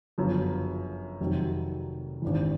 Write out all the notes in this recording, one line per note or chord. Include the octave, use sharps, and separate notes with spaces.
G1 F#2 C#3 F3
F1 F2 C3 D#3 F#3
G#1 G2 E3